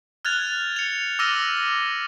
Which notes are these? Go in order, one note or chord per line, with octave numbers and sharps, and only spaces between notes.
F6 F#6 G#6 A6 F7
C#7 F7
D6 E6 F6 A#6 D#7